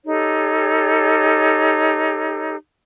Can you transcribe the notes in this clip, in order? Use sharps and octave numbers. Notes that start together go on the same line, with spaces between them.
D#4 G4 A4 C#5